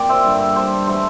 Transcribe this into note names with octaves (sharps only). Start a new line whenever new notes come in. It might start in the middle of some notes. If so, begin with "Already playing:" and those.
Already playing: A#2 C4 D5 G5
C5 E5
G2 D3 G3
A4 C5
E3 A3 A4 C5